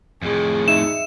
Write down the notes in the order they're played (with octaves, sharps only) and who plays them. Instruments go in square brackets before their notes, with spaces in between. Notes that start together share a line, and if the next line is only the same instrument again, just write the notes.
[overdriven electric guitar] F2 A2 [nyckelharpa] G#4
[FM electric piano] D#4 E5 C#7 [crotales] E7